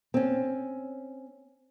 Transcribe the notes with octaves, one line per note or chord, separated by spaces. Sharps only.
C4 C#4